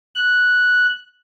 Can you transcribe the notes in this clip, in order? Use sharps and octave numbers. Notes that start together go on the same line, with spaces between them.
F#6